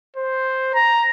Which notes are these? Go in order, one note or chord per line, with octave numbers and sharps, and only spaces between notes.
C5
A#5